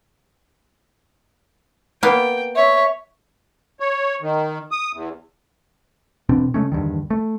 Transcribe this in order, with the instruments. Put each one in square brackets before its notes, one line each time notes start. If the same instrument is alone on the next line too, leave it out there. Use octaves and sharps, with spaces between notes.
[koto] A#3 B3 [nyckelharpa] G5
[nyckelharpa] C#5 [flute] E5
[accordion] C#5
D#3
D#6
E2
[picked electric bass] E1 B2 C4 D4
C#3 G#3 A3 C#4
E2 G2 D3 D#3
A3